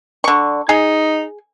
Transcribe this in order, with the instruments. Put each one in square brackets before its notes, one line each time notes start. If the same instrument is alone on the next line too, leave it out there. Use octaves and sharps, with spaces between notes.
[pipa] D3 C#6
[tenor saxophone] D#4 [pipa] G#4